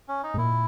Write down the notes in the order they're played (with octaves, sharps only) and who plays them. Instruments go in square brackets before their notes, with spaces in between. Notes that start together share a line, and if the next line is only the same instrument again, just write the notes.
[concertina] C#4
D#4
[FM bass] G#2
[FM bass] A#2 [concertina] E4